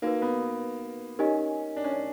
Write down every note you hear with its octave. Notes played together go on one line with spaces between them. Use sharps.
A#3 D#4 F#4 B4
B3
C#4 D#4 G4 A#4 D#5 G#5
D4
C#4
D4